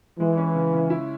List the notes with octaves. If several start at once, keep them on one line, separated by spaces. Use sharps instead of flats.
E3 G#3
C#4
C#3
C#3
E4